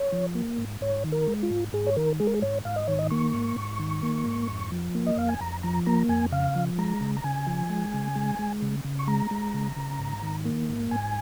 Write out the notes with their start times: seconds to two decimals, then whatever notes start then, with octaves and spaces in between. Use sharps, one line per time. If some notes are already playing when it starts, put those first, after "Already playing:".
Already playing: C#5
0.12 F3
0.35 A#3
0.58 G#2
0.81 G#2 C#5
1.04 D#3
1.12 A#4
1.27 G#3
1.43 F4
1.50 G#2
1.73 G#2 G#4
1.86 C#5
1.96 D#3 A#4
2.20 G#3 G#4
2.27 A#4
2.34 G#4
2.42 G#2 C#5
2.65 G#2 F5
2.76 D#5
2.88 D#3 C#5
2.99 D#5
3.10 A#3 C#6
3.34 G#2
3.57 G#2
3.79 D#3
4.03 A#3
4.26 G#2
4.49 F2
4.72 F3
4.95 A#3
5.06 D#5
5.17 F2 F5
5.29 G#5
5.41 F2 A#5
5.63 F3 A#5
5.86 A#3 A#5
6.09 F2 G#5
6.32 C#3 F5
6.55 F3
6.78 G#3 A#5
7.01 C#3
7.17 A#5
7.24 C#3 G#5
7.47 F3
7.70 G#3
7.94 C#3
8.16 G#3
8.39 G#3
8.62 C#3
8.85 C#3
8.99 C#6
9.07 G#3 A#5
9.31 G#3
9.54 C#3
9.76 C#3
9.99 G#2
10.23 D#3
10.45 A#3
10.69 G#2
10.91 G#2 G#5